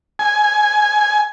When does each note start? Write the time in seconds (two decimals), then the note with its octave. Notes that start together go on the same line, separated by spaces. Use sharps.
0.19 G#5